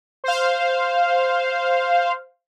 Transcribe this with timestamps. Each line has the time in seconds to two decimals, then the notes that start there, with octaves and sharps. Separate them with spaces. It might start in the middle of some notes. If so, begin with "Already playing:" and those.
0.24 C5 F5